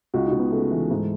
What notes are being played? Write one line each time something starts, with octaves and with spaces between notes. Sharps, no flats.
C#2 F#4
D#4
C#2
B3
C#3 A3
E3
G#2